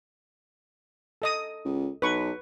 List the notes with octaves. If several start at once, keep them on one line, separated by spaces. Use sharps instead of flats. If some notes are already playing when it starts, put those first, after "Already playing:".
A4 D#5 D#6
C#2
B1 B4 C#6